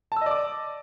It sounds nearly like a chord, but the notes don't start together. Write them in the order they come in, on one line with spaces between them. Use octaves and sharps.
A5 E6 D#5 D5 D6